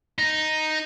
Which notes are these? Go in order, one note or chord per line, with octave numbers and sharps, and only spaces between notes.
D#4